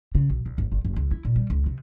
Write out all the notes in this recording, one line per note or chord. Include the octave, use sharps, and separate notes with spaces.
C#3
B1
C2
G1
G1
F#1
C#2
E4
A#2
G3
C#2
C3